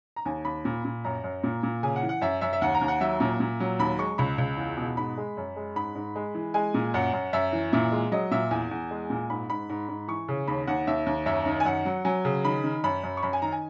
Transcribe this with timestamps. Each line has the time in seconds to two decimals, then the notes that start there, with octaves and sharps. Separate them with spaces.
0.16 A#5
0.25 D#2 G#5
0.45 D#2 B5
0.65 A#2
0.85 A#2
1.04 F#2 A#5
1.24 F#2
1.44 A#2
1.63 A#2
1.83 C#3 G#5
1.96 F#5
2.03 E3
2.09 F#5
2.22 F#2 E5
2.41 F#2 E5
2.53 E5
2.62 D#2 F#5
2.75 A#5
2.81 D#2
2.88 F#5
3.01 F#3 E5
3.20 A#2
3.40 A#2
3.60 F#3
3.79 D#2 B5
3.99 G#3 C#6
4.18 C#2 B5
4.38 C#2
4.57 E2
4.77 B2
4.97 G#2 B5
5.17 G#3
5.37 F#2
5.56 G#3
5.76 G#2 B5
5.95 G#2
6.16 G#3
6.35 E3
6.54 G#3 G#5
6.74 A#2
6.94 F#2 F#5
7.13 F#2
7.33 F#2 E5
7.53 E3
7.73 A#2 E5
7.92 G#3
8.12 F#3 D#5
8.31 A#2 E5
8.51 E2 G#5
8.71 E2
8.91 G#3
9.10 A#2
9.30 G#2 B5
9.50 G#2 B5
9.70 G#2
9.89 G#2
10.08 E3 C#6
10.28 C#3
10.48 D#2 B5
10.67 D#2 F#5
10.87 D#2 E5
11.06 D#2
11.26 F#2 E5
11.46 D#3
11.60 G#5
11.65 F#2 F#5
11.85 F#3
12.05 F#3 G#5
12.25 C#3
12.44 D#3 B5
12.64 D#3
12.84 F#2 B5
13.04 F#2
13.17 C#6
13.23 F#2 B5
13.33 G#5
13.42 D#3 A#5
13.52 G#5